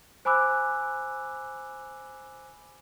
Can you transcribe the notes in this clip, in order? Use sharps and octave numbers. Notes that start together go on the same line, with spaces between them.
C5 G#5 B5 D6 E6 F#6